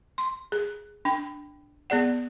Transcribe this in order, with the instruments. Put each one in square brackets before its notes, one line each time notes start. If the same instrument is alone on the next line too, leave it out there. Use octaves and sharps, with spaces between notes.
[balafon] C6
G#4
D4 G5
B3 G#4 D5 F#5